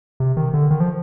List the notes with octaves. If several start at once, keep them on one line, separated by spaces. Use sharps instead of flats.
C3
D#3
D3
D#3
F3